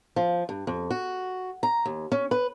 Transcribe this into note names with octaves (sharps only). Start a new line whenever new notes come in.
F3
G2
F2
F#4
A#5
D#2
C#4
B4